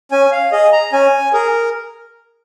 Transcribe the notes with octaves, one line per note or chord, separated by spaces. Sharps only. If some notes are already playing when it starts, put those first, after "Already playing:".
C#4 G#5
F5
G#4 D#5
A#5
C#4 G#5
G#4 A#4